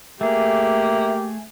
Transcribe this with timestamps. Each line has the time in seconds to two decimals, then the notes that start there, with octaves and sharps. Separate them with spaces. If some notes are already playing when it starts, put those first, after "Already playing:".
0.21 A3 A#3 G4 G#4 E5